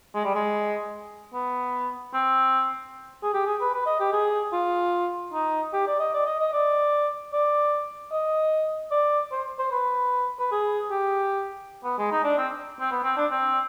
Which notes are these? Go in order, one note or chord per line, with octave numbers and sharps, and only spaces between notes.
G#3
G3
G#3
B3
C4
G#4
G4
G#4
B4
B4
D#5
G4
G#4
F4
D#4
G4
D5
D#5
D5
D#5
D#5
D5
D5
D#5
D5
C5
C5
B4
B4
G#4
G4
B3
G#3
D#4
D4
C4
C4
B3
C4
D4
C4